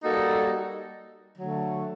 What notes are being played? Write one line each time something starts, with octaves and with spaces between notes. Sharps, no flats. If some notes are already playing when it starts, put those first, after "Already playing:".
G3 A#3 D#4 F#4 A4
D3 F#3 A3